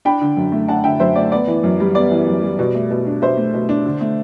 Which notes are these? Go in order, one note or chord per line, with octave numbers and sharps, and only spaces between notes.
D4 G5 B5
D3
F#2
A3
D4 F#5 A5
D3 E5 G5
F#2 C5 E5
A3 D5
B3 D5
E3
F#2
G3
B3 D5
E3
F#2
G3
B2
A3
B2
D4
B2 C5 E5
A3
B2
D4
D3
A3